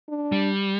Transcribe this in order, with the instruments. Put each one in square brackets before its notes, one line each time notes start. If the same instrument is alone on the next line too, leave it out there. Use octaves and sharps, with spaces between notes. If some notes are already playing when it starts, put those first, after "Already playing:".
[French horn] D4
[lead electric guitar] G3